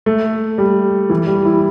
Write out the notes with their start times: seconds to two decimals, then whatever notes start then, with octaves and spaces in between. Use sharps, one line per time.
0.06 A3
0.58 G3
1.10 E3
1.27 G3
1.45 E4